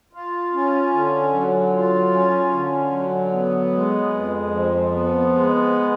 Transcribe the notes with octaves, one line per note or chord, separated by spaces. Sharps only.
F4
C#4
D3
F#3
F4
C#4
D3
F#3
B3
G#3
F2
F3
B3
G#3